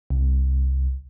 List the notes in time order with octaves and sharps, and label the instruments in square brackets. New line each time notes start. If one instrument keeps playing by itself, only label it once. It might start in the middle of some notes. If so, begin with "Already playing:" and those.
[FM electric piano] C2